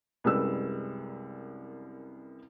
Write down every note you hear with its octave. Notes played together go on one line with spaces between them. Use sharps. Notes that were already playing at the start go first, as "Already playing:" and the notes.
C2 F#2 G3 G#3 B4 E6